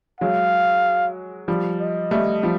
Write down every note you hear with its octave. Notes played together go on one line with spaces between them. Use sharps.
F#3 G#3 F5
F3 G3
D#5
G3 A3
F3 G3